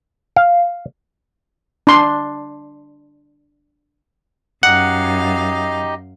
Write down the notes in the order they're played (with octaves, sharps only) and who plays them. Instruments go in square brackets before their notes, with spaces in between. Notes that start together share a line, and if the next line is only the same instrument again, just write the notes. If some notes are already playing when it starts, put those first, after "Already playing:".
[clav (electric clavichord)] F5
[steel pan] D4 C6
[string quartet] F#2 F5 [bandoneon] D#4 G4 D#5 [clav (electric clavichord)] F#5